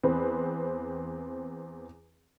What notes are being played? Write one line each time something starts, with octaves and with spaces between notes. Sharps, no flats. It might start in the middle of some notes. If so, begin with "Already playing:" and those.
E2 C4 B4